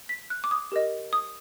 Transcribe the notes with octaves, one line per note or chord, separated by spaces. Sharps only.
B6
F#6
D6
D#6
G4 A#4 D#5
D#6